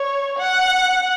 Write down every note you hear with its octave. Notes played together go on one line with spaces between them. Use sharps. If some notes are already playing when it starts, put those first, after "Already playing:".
Already playing: C#5
F#5